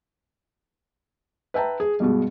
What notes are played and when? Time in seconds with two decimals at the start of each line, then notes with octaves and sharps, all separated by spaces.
1.54 B4 E5 G5 A5 A#5
1.80 G#4
2.00 G2 B2 G#3